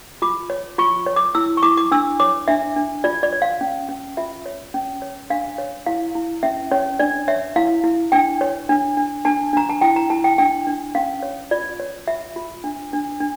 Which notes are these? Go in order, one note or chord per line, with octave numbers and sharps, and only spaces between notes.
F4 D6
C#5
F4 C#6
C#5
D6
E4 E6
C#6
E4 D6
D6
D4 E6
C#5 D6
D4 E5
D4
F4 D5
D5
C#5
F5
C#4
C#4
F4 E5
C#5
C#4
C#5
D4 F5
C#5
E4 F5
E4
C#4 E5
C#4 C#5
D4 D5
C#5 E5
E4 F5
E4
D4 G5
C#5
D4
D4
D4 A5
D4 A#5
A5
E4 G5
A#5
E4 A5
G5
D4 G5
D4
C#4 F5
C#5
F4 D5
C#5
F4 E5
F4
D4
D4
D4